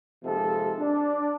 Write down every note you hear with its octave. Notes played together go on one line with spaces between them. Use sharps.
D#2 C3 F3 G#3 A4
D4